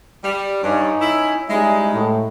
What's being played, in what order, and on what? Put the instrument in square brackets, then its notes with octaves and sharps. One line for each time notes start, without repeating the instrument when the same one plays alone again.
[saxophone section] G3
[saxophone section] G2 [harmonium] C#4 D#4 C#5
[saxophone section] E4
[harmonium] G3 C#4 D#4 [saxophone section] G#3 [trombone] E4
[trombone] A2